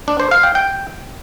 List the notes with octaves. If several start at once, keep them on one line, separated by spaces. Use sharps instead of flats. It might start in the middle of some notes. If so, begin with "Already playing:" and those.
D4
C5
F5
G5
G5